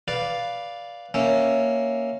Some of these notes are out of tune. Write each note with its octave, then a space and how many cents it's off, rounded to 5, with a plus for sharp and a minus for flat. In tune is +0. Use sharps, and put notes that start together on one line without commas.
B4 +0 D5 -5 F5 +0
A#3 +0 C#4 +0 E5 +0